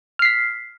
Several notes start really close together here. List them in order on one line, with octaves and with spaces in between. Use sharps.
F6 C7 B6